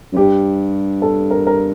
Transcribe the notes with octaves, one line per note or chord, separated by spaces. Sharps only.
F#2
G2 G4
A4
A#4
A#4